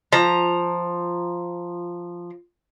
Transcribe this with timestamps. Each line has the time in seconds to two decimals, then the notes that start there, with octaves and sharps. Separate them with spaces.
0.12 F3 A#5